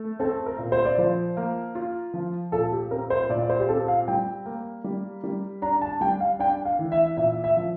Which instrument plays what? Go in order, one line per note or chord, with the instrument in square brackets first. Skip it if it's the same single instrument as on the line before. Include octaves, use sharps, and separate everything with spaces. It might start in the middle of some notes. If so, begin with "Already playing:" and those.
Already playing: [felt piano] A3
[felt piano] C4 [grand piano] A4
[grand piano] A#4
[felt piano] A#2
[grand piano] C5
D5
[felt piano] F3 [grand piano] C5
[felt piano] A#3
F4
F3
[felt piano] A#2 [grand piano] A4
[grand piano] G4
[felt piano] C4 [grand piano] A#4
[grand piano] C5
[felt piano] A#2 [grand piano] D5
[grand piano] D5
C5
G4
[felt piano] C4 [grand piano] A4
[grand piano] F5
[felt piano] G3 [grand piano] G5
[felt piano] A#3
G3
G3
[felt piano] D4 [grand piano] A#5
[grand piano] A5
[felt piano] G3 [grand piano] G5
[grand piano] F5
[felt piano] D4 [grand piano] G5
[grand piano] F5
[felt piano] E3
[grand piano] E5
[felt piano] A#2 [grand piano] E5
[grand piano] E5
[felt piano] F3